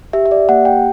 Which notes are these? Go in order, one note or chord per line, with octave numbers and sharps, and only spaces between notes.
G4 E5
E5
D5
A#3 F#5
G5